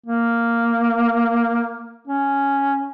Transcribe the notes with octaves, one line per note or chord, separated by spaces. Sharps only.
A#3
C#4